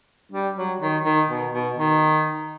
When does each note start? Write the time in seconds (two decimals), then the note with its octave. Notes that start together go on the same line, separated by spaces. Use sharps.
0.32 G3
0.56 F#3
0.80 D#3
1.04 D#3
1.28 B2
1.52 B2
1.76 D#3